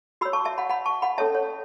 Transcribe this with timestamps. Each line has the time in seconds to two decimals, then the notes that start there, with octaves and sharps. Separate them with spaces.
0.21 F#4 C#5 B5 E6
0.33 A5 C#6
0.45 E5 A5
0.58 F#5 B5
0.69 F#5 B5
0.86 A5 C#6
1.02 F#5 B5
1.18 C#4 A4 C#5 E5 A5
1.35 C#5